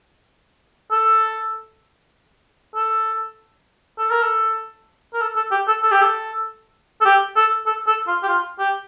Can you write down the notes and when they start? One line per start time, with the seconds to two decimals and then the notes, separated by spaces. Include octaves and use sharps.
0.91 A4
2.76 A4
3.99 A4
4.11 A#4
4.23 A4
5.13 A#4
5.22 A4
5.36 A4
5.51 G4
5.68 A4
5.83 A4
5.91 G4
6.01 A4
7.01 A4
7.05 G4
7.36 A4
7.66 A4
7.87 A4
8.07 F4
8.23 G4
8.28 F4
8.59 G4